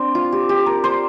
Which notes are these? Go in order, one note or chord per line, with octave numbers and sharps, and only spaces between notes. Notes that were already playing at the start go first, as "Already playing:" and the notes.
Already playing: C4 D4
F4
G4
G4
A#4
C5